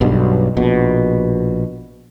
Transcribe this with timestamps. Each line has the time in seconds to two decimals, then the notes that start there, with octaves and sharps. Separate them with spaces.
0.01 B1 G2 B2
0.57 A#1 B2